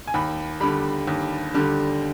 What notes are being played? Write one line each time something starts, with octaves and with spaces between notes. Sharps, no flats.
G#5
D#2 B5
D3 G3 B5
D#2
D3 G3